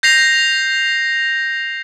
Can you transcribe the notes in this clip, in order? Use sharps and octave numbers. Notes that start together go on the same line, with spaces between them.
G6 A#6 C7 F7